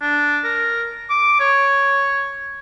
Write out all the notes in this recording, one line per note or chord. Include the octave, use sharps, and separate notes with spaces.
D4
A#4
D6
C#5